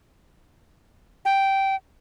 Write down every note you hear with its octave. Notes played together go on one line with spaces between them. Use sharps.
G5